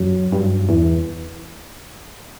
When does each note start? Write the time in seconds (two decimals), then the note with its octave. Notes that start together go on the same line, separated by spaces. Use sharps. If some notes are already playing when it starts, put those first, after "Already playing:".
Already playing: F#2 F#3
0.32 G2
0.69 E2 E3